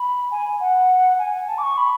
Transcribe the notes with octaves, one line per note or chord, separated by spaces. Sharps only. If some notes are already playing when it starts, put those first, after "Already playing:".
Already playing: B5
G#5
F#5
G#5
A5
D6
C#6
B5